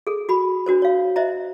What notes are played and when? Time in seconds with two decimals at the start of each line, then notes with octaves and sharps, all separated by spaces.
0.07 G#4 A4
0.29 F#4 B5
0.66 D4 F#4 A#4 C5
0.82 C#5 F5
1.16 C5 D#5 E5 A#5